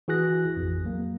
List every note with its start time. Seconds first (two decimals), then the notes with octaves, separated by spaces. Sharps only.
0.08 E3 F#4 G#4 F#6 A#6
0.57 A1 F2
0.85 F#3 A#3